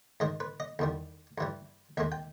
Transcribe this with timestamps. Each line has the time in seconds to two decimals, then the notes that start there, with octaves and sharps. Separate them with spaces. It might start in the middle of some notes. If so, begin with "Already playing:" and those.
0.20 G#2 D#3 G#3 D#5
0.40 B4
0.60 D#5
0.79 E2 D#3 G3
1.38 G2 E3 G3
1.97 D#2 D#3 G#3 E5
2.12 G5